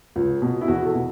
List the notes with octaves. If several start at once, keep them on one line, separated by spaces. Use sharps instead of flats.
C#2
B2
E4
E2 F#4
A4
B2